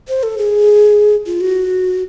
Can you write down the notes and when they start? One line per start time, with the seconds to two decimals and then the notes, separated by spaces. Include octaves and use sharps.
0.08 C5
0.23 A4
0.38 G#4
1.26 F4
1.41 F#4